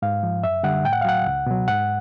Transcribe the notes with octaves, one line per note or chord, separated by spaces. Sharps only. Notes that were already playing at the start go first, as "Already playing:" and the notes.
G#2 F5
F3
F#2 E5
D3 G3 F#5
A2 G5
F#5
F5
F#3 F#5
C#2
B2 F#3
G#2 F#5